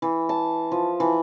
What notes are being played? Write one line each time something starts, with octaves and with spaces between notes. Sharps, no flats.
E3
A5
F3
E3